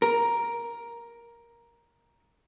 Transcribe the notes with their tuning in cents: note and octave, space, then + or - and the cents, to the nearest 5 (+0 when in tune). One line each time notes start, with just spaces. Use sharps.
A#4 +10